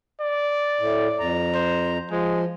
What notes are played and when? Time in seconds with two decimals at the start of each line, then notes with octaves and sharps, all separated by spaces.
0.21 D5
0.80 A2
1.19 F2 A#5
1.55 C5
2.11 F3 G#3